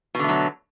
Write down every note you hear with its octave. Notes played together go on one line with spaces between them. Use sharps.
B2 D3 F#3 A3